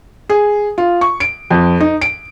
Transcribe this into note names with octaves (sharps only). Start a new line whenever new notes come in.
G#4
F4
C#6
D7
F2
D#4
D7